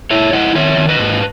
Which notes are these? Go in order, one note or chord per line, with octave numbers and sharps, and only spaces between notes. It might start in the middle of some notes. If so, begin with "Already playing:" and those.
E4 C#5 E5
E4 D#5 F#5
D#3 C#5 E5
D#3
B4 D#5
G#2